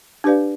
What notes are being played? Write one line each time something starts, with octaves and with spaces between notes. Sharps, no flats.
D4 G4 B4 D5 F5